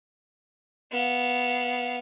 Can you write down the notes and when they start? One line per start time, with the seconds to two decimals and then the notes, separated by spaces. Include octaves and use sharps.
0.91 B3 F5